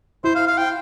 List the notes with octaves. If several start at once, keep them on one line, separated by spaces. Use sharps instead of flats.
E4 C5
F5
F5
G5